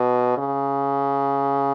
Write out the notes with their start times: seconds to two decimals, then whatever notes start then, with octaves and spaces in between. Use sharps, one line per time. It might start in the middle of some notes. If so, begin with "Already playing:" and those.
Already playing: B2
0.38 C#3